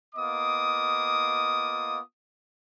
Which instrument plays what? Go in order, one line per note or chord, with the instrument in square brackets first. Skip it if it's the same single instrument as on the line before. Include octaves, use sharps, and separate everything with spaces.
[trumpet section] A#3 B3 F4 D#5 D6 D#6